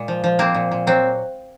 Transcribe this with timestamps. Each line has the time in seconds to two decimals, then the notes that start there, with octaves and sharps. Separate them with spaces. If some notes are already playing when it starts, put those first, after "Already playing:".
Already playing: A#2 G#3
0.08 F3
0.24 F3
0.39 G#3 A#3 C4
0.54 A#2
0.71 A#2
0.87 F#3 C4